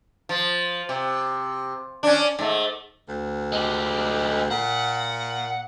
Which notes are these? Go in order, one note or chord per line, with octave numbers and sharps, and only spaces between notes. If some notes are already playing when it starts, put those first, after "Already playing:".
F3
C3
C#4 D4
G#2 A3
D2
G#3 G4
A#2 F#5